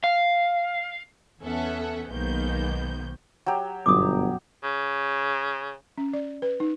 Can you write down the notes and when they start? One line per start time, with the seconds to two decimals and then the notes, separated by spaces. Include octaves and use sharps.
0.04 F5
1.41 E2 B3 C#4 A4 E5 F#5
2.08 B1 G#2 D#3 A#3 B3 G6
3.46 F#3 G4
3.86 G1 F#2 B2 D6 D#6
4.64 C#3
5.98 C#4
6.13 D5
6.42 B4
6.60 D#4